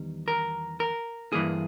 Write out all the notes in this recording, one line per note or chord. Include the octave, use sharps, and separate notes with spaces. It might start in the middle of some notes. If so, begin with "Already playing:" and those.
Already playing: E2 D#3 G3
A#4
A#4
G2 E3 A#3 G#4